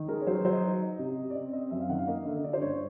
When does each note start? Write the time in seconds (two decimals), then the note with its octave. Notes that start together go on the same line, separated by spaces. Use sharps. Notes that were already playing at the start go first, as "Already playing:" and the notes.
Already playing: D#3
0.08 G#3 A#4
0.21 C#5
0.27 F#3 C5
0.35 B4
0.45 F#3 C5
0.53 D#5
0.62 D#4
0.81 D#4
0.99 C3
1.17 C3
1.30 D5
1.35 C4 D#5
1.53 C4 D#5
1.71 F#2 E5
1.80 F5
1.89 D#3 F#5
1.98 F5
2.07 A#3 D#5
2.25 D3 E5
2.36 D#5
2.44 D3 D5
2.53 C5
2.61 G2 C#5